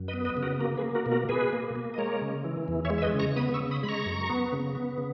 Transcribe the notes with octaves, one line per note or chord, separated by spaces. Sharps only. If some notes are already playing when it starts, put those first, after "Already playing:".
Already playing: F#2
B4 D#5
B3
B4 D#5
C#3
F#4 A#4
A#3 F#4 A#4
G#4 B4
A#3
F#4 A#4
B2
F#4 A#4
B2 G#4 B4
A#3
A#3
D#5
G#3 A#4 C#5
C#3
E3
E2
C#5 E5
G#3
E5
B4 D#5
C#3
A#5 C#6
B3 B5 D#6
C#6 E6
C#3
B5 D#6
G#3 B5
A#5 C#6
F#2
B3
C#3
B3
C#3